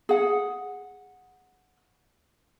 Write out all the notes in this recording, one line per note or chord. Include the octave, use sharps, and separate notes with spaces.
G#4 F#5